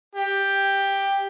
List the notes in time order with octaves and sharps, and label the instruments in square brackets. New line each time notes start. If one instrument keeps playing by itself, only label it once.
[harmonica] G4